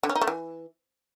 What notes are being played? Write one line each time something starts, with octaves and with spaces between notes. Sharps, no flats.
D3
C#4
D#4
A3
E3